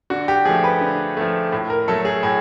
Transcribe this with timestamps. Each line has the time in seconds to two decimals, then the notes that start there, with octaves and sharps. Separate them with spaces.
0.10 D3 F#4
0.28 G4
0.45 F3 A3 G#4
0.64 B4
0.81 D3
1.17 F3 A3
1.52 A2
1.70 A#4
1.88 F#3 A3 A4
2.05 G#4
2.23 A2 G#4